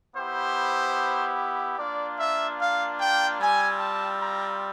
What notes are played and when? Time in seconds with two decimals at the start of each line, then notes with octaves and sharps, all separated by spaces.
0.14 B3 E4 G4 C5
1.77 A#3 D4 F4 D5
2.18 E5
2.59 F5
2.99 G5
3.39 G3 C4 F4 G#5
3.80 A5
4.20 A#5